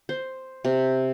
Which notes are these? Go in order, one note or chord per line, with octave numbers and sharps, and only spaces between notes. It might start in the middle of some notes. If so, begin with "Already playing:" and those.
C5
C3